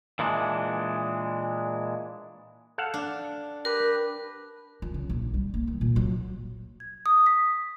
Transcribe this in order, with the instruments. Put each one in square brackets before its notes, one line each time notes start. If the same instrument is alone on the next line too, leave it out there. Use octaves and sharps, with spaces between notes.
[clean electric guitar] A#2 E3 G#3 D4
[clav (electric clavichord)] A4 F5 F#5
[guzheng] D4
[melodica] G4 B4 [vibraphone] A#4
[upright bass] F3
C#3
A#1
G3
A#3
D#3
A#2
F#3
[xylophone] G#6
D#6
B6